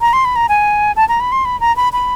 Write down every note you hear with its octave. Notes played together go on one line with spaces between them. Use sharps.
A#5
C6
B5
A#5
G#5
A5
A#5
B5
C6
B5
A#5
B5
B5